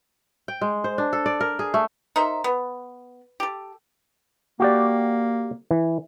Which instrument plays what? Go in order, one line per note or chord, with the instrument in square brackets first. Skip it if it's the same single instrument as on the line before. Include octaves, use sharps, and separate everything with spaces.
[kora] G5
G#3
C5
D4
A4
D5
A#4
G#4
A3
[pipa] D#4 A#4 C5 E5
B3
G4 A4
[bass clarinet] A#3 [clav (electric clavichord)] F#4 G4 D5
[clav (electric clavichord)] E3